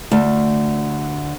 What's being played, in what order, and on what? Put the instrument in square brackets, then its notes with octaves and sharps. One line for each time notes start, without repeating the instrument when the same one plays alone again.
[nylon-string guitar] D2